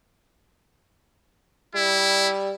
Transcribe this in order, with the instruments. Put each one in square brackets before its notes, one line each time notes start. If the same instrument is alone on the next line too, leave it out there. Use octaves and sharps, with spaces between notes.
[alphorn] G3 [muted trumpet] E4